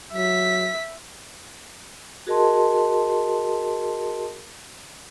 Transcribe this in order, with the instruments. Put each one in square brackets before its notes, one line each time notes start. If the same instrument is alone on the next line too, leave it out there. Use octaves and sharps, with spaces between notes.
[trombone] F#3 [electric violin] E5 B6
[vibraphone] F#4 G#4 A#4 D#5 A5 C6